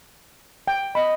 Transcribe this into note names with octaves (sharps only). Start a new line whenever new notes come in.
G5
D#5 B5